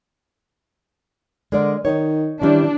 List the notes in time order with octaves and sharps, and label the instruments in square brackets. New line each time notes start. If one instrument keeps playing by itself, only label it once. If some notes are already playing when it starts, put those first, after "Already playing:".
[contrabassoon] D3 [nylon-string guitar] G#3 A#4 D5
[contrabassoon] D#3 [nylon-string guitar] D#4 C#5
[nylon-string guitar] D#3 G3 C#4 [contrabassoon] E3 [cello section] D4